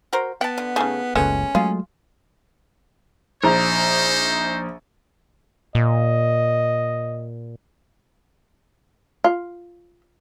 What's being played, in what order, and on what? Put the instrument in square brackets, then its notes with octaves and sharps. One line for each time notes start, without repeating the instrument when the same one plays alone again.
[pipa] F#4 A#4 C5
[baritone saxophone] B3 [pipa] F#5 A5 [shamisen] G5
[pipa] D3
[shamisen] C#3 A3 [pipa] D#4 G#4 A4
[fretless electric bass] F#1 C#2 [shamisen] G#3 A3 B3 [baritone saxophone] C#4
[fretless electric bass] F#3 G#3 A3 [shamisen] F4 [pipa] G#4
[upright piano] A#1 A#5 [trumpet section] D#4 C5
[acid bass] A#2 [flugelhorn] D#5
[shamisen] F4